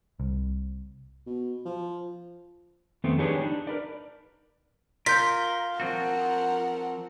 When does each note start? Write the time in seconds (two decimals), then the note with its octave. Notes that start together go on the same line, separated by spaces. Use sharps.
0.20 C2
1.26 B2
1.65 F3
3.04 F2 D#3 A3 B3 C4
3.19 D4 D#4 G4 G#4 B4 C#5
3.41 D4 D#4
3.67 A#4 B4 D5
5.06 F4 A#4 G6 B6
5.80 F3 C4 F#4 A#4 F#5